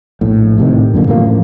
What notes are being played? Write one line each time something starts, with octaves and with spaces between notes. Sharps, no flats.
A#1 A2
A2 C3 D#3
F#2 A#2 D3 A#3
A1 F3 G3 A#3